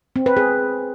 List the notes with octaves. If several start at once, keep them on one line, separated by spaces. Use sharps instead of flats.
C4
B4
G#4